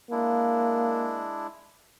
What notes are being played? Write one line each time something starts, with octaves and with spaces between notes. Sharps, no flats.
G#3 A#3 D4 E4